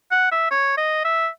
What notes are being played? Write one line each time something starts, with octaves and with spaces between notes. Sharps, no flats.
F#5
E5
C#5
D#5
E5